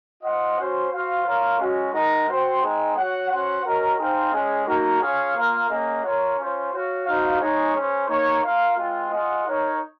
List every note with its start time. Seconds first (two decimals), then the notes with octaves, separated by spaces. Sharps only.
0.22 F4 C5 D#5 F#5
0.56 C#4 F#4 C5
0.90 F#4 C5 F5
1.25 F4 A#4 C#5 F5
1.58 G#3 C#4 F#4
1.93 G#3 D#4 A#4 D#5 F#5
2.27 C4 F#4 C5 F#5
2.62 G#3 C4 D#4 G#4
2.95 F#4 C#5 F#5
3.29 C#4 F#4 C5 F#5
3.63 C#4 F#4 A#4 D#5
3.98 C4 D#4 G#4 C5 F5
4.32 G#3 C#4 G#4
4.66 A#3 D#4 F#4 A#4
5.01 C#4 F4 G#4 C#5 F5
5.35 A#3 F4 A#4 F5
5.69 A#3 C#4 G#4 D#5 F#5
6.03 F4 A#4 C#5
6.37 C#4 F4 C5
6.72 F#4 C#5 F5
7.05 D#4 F#4 C5 F5
7.40 G#3 D#4 G#4 C#5
7.74 C#4 G#4 C5
8.08 A#3 D#4 A#4 C#5
8.42 F4 A#4 F5
8.77 G#3 C4 F4
9.11 F4 G#4 D#5 F#5
9.46 D#4 A#4 C#5